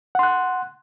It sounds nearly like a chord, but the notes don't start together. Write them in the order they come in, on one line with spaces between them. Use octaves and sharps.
F#5 C6 F#6